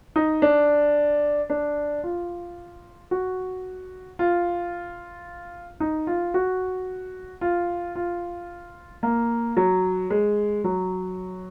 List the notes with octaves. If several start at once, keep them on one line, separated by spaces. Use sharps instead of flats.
D#4
D4
D4
F4
F#4
F4
D#4
F4
F#4
F4
F4
A#3
F#3
G#3
F#3